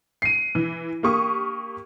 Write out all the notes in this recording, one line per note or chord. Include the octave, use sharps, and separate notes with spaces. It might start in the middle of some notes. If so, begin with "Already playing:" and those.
C7 D#7
E3
A#3 G4 C#6 D#6